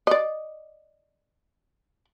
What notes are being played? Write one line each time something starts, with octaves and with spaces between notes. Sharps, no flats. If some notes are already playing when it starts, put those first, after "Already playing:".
D5 D#5